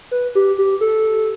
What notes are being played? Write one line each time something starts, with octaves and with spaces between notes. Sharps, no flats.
B4
G4
G4
A4